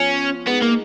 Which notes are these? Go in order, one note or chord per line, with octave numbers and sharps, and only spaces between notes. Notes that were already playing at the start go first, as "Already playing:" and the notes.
Already playing: F3 B3 C#4 F4
G#3 B3 D#4 G#4
A#3